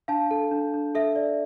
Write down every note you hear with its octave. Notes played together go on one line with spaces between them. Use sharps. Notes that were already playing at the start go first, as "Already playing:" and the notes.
D4 F5 A5
A4
D4
D4
A4 E5
D5